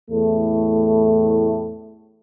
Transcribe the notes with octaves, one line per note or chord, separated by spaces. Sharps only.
E2 A2 A3